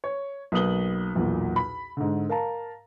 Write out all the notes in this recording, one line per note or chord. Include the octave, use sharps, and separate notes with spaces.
C#5
B1 A#3 B4 D#6 F#7 G7
B1 E2 A#2
B5
G#2 D3
A#4 F5 A5 A#5